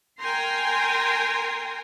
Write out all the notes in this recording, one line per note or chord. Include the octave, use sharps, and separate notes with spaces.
A#4 G5 G#5 A#5 C6